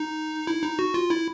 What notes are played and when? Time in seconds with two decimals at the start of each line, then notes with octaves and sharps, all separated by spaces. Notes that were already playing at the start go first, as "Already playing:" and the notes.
Already playing: D#4
0.47 E4
0.63 D#4
0.79 F#4
0.94 F4
1.10 E4